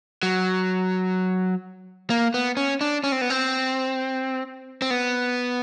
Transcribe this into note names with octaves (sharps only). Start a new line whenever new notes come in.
F#3
A#3
B3
C#4
D4
C#4
C4
B3
C4
C4
B3